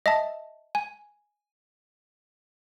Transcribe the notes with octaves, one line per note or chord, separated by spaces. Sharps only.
D#5 E5 A5
G#5